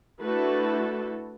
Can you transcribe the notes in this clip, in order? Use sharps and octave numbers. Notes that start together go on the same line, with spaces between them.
A3 D4 E4 F#4 A4 B4